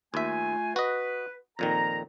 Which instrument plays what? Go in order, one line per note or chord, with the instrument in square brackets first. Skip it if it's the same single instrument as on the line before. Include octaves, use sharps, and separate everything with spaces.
[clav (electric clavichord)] D#2 E5 [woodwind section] A3 F4 G#5
[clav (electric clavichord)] F#4 D#5 [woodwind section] B4
[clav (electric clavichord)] F2 A#2 D#3 [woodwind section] A#5